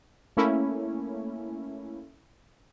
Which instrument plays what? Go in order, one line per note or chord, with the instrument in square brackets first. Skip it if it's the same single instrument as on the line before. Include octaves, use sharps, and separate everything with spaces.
[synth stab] A3 A#3 C#4 E4